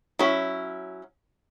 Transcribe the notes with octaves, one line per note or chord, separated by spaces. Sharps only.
F#3 C#4 E4